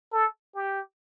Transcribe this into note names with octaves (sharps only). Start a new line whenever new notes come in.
A4
G4